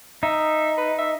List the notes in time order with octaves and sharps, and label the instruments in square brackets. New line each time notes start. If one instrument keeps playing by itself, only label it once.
[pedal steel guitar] D#4 [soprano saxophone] E5
[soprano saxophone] B4
E5